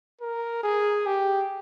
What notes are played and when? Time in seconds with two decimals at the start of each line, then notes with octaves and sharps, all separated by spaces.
0.21 A#4
0.63 G#4
1.06 G4